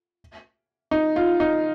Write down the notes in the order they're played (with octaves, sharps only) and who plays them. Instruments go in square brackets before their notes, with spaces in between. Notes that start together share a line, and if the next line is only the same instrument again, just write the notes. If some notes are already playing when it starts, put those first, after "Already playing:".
[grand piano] D#4
F4
D#4